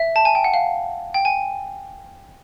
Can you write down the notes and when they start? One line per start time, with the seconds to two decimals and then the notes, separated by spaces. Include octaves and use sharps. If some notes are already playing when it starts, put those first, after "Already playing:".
Already playing: E5
0.16 A5
0.25 G#5
0.35 G5
0.44 F#5
0.54 F5
1.14 G5
1.25 G#5